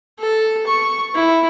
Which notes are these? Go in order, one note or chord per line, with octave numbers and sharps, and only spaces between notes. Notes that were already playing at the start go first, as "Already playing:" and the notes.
A4
C#6
E4